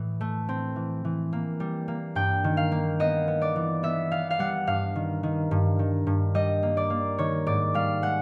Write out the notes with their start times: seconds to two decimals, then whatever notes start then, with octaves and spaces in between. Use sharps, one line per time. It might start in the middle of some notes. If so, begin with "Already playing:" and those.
Already playing: A2 E3
0.21 A3
0.49 C4
0.76 E3
1.05 E3
1.33 A#3
1.60 G3
1.88 A#3
2.15 G2 G5
2.44 D#3
2.57 F5
2.72 A#3
3.00 B3 D#5
3.28 B3
3.42 D5
3.56 E3
3.83 B3 E5
4.11 B3 F5
4.31 F5
4.39 G3 F#5
4.67 G2 F5
4.95 D#3
5.23 D#3
5.51 G2
5.79 D#3
6.07 G2
6.35 G3 D#5
6.63 A#3
6.77 D5
6.90 A#3
7.18 D#3 C#5
7.46 G#2 D5
7.74 G3 F5
8.02 G#3 F#5